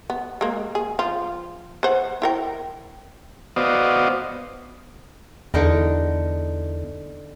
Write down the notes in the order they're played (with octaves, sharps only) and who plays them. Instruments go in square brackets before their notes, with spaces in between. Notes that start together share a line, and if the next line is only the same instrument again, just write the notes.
[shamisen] B3
G#3 A#3
G#4
F3 F4
B4 C5 F#5
E4 A#4 G5
[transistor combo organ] B3 F#4 C5 D5 D#5 F5
[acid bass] E2 [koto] D3 D#4 A#4